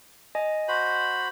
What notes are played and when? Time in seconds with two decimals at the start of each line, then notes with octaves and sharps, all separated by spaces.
0.35 D#5 G#5 A#6
0.68 F#4 C5 B5